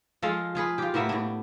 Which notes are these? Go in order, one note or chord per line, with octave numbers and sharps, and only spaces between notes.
F3 G#3 F4 A4
F4 G#4 B4
F4 G4
A2 A#3 B3 E5
A2 D4